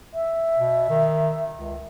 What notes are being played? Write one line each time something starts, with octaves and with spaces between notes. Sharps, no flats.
E5
B2
D#3
C#2